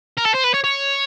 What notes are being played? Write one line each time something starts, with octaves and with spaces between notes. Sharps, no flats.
A#4
A4
C5
B4
C#5
C#5